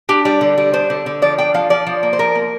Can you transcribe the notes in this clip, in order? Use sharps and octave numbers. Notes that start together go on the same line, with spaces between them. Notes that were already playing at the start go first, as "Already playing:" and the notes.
D4 G4
G3
D3
G3
D4 C5
D3
D3
F3 D5
D4 G5
F3 F5
F3 D5
F3
A#3
C5
F3 A#4
A#3